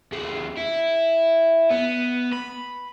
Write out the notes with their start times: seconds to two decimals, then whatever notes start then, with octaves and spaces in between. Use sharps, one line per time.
0.12 D#2 G#4
0.57 E4
1.70 B3
2.33 B5